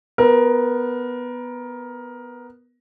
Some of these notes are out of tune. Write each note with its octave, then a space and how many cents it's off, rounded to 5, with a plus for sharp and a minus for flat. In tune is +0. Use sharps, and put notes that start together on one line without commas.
B3 +0 A#4 +15